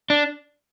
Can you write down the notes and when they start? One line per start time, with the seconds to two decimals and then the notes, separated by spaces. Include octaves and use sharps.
0.10 D4